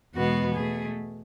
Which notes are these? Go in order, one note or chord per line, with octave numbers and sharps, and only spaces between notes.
E2 B2 G#3 B3 F#4
B2 A3 G#4